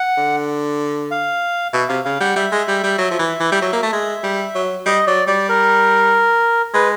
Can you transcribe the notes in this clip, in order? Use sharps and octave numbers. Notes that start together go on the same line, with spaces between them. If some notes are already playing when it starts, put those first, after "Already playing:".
Already playing: F#5
D3
F5
B2 E5
C3 F5
C#3 F5
G3 F#5
G3 E5
G#3
G3
G3
F#3
F3
E3
E3
G3
F#3
A#3
A3
G#3
G3
F#3
G3 D#5
F#3 D5
G3 D5
A#4
G#3 B4